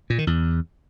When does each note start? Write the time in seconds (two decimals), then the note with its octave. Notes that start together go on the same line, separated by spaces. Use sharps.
0.10 A#2
0.18 D#3
0.27 E2